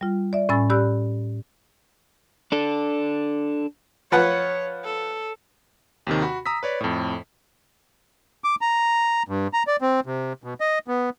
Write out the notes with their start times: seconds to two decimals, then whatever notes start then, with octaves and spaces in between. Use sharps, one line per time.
0.01 G3 F4
0.33 D5 E5
0.49 A2 C#4 G#5 B5 E6 A6
0.70 G4 D5 B5 E6 F#6
2.52 D4 A4
4.12 F3 B4 C#5 F#5
4.85 A4
6.07 D#2 C3 D#3
6.22 F#4 B5
6.46 A#5 D#6 E6 B6
6.63 B4 C#5 D5
6.81 F2 A2
8.44 D6
8.61 A#5
9.28 G2
9.53 A#5
9.67 D5
9.81 C4
10.06 C3
10.44 B2
10.60 D#5
10.88 B3